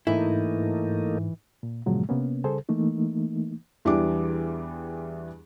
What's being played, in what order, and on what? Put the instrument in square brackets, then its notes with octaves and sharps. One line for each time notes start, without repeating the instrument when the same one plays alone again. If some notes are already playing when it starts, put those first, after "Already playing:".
[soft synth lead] G#2 [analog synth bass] E3 [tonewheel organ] A3 A#3 D#4 [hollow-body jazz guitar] E4
[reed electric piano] A#2
G2 A#2 C#3 F3 F#3 G#3
C3 A#3 B3 C#4
C#3 G3 G#4 A4 C5
E3 A3 A#3 D#4
[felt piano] E2 E3 G3 D4 D6